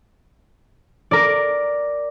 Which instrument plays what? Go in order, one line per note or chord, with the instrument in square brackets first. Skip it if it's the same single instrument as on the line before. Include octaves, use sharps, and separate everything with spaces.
[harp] A#4 D5